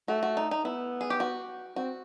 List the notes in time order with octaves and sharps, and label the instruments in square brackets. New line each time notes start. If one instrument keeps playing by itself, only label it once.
[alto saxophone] A3 [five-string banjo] F#4
[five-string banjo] F#4
D#4
D#4
[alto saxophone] B3 [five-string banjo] E4
[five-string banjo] G#4
G4
F#4
[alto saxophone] C4 [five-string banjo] F#4